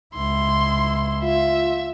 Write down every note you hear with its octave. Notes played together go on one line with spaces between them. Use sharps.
C#2 E4 C6
F4 E5